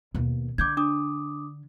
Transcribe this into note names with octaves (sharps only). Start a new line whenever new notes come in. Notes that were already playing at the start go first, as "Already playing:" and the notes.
D#2 B2
D3 D6 G6 G#6
D4 D6 D#6